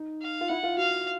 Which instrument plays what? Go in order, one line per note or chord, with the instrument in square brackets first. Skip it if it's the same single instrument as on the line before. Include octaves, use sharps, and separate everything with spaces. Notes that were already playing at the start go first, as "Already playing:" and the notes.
Already playing: [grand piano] D#4
[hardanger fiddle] F5
[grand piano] F4
[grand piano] E4 [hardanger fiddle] F#5
[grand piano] F4
[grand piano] F#4 [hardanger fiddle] F5